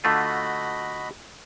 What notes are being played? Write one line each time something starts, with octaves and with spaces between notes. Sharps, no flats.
D3 A3 F4 F#4 D#5 B5